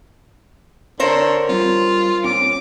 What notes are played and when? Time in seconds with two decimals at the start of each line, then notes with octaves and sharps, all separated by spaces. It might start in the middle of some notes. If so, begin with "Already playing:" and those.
1.00 D3 A#4 C5 C#5 F5
1.49 G3 C4 F4
2.24 A#2 C4 C#4 D6